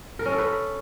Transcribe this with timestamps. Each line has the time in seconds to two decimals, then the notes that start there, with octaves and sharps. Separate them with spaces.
0.19 A#4
0.26 C#4
0.32 A4
0.38 B4